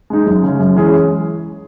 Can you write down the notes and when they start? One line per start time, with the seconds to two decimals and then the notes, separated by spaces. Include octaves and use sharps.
0.10 G#3 D#4
0.26 F#2
0.43 C#3 G#3 C#4
0.59 F#2
0.76 E3 G#3 C#4 G#4